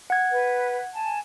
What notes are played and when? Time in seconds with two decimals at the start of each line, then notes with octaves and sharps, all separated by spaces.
0.10 F#5 G#6
0.33 B4
0.95 G#5 A5